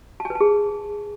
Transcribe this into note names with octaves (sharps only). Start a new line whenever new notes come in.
A5
G#5
B4
A5
G#4